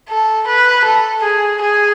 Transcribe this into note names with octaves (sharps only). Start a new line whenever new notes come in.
A4
B4
A4
G#4
G#4